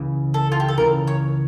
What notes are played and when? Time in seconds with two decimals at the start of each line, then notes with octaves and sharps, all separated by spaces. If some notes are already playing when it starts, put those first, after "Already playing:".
Already playing: C#2 C#3 E3
0.34 A4
0.52 F4
0.60 G4
0.69 A4
0.78 C#2 C#3 E3 A#4
1.07 C#5